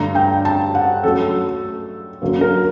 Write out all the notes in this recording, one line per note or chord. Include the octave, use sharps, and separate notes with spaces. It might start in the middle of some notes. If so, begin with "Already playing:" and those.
Already playing: G2 D3 A3 A#5
G5
A5
F#5
F#2 F#3 A3 A4
F#2 D3 F#3 A#3
A#4